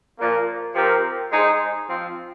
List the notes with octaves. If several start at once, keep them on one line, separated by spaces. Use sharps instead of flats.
A#2 F3 A#3
F3 C4 G4 A#4
G#3 D#4 G#4 C5
F3 C4 F4